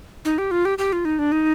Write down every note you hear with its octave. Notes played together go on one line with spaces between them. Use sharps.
D#4
G4
F4
G4
G4
F4
D#4
D4
D#4